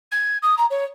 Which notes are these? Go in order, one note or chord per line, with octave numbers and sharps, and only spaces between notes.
G#6
D#6
A#5
C#5